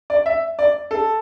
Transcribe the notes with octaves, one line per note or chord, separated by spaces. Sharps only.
D5
E5
D5
A4